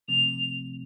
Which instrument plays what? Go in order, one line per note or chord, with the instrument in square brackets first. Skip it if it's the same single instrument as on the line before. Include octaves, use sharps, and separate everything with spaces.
[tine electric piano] C3 F3 A3 C4 [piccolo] F7